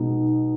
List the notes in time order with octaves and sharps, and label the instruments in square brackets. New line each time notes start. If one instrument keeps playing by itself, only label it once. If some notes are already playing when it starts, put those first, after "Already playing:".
Already playing: [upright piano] B1 B2 G#3 D#4